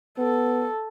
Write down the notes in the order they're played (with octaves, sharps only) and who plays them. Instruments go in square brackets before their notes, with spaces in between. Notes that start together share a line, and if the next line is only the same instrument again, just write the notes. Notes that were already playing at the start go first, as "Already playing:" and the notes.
[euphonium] B3 [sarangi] A4